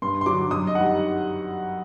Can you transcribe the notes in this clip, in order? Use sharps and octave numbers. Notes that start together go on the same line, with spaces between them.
G2 C6
C6
D3 F#3 D6
F#2 D#6
D#5
D#3 G3 F#5